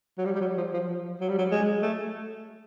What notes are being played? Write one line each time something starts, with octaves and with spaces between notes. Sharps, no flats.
F#3
G3
G3
F#3
F3
F3
F3
F#3
G3
F#3
G#3
A3